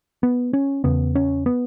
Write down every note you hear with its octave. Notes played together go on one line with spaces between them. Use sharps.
B3
C#4
E2 C#3 B3
C#4
B3